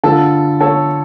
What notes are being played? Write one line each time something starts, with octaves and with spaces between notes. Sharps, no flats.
G2 D3 F4 A4
A4 C#5